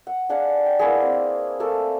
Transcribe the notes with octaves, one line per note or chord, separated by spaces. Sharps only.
F#5
D4 G#4 F5 F#5
G5
A#3 B3 E4 G#4
C4
A3 A#3 A4